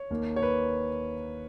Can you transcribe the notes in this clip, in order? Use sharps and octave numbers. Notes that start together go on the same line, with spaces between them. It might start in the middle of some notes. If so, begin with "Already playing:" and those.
Already playing: C#5
D#2 D#3 A#3
C#5
B4